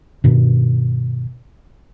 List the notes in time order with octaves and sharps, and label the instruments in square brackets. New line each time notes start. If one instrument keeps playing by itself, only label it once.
[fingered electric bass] G2 B2 D#3